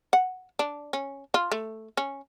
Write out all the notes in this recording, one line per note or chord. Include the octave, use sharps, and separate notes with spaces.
F#5
D4
C#4
F4
A3
C#4